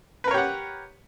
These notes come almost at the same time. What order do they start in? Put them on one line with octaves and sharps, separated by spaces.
B4 A#4 C#5 G4 F#5